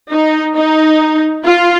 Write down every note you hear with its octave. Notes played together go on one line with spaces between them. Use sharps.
D#4
D#4
F4